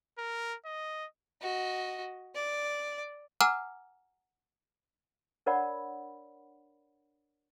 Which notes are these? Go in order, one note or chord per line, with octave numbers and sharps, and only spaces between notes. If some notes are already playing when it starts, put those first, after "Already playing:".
A#4
D#5
F#4 D#5
D5
F#5 G#5 A#5 D6 E6 F6
D4 A#4 C#5 D5 F#5 B5